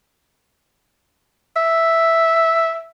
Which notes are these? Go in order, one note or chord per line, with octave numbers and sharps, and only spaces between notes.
E5